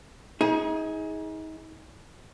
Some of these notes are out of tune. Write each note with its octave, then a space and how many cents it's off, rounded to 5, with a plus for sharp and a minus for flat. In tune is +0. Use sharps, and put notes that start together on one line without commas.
D#4 +35 G#4 +0